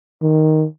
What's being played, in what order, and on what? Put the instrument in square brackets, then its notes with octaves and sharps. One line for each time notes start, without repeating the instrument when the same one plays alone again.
[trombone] D#3